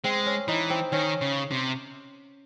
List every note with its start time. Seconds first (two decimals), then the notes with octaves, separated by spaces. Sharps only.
0.04 G#3 C4
0.26 C#4
0.48 E3 D#4
0.70 C4
0.92 D#3 C#4
1.21 C#3
1.51 C3